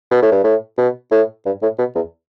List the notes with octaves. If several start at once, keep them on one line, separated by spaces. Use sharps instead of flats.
B2
A2
G2
A2
B2
A2
G2
A2
B2
E2